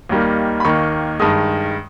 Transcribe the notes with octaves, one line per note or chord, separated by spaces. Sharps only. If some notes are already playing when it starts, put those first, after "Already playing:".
D#2 D#3 G3 A#3
B5
D#2 D#3 A#3 C#6
G2 D#3 G#3 D#6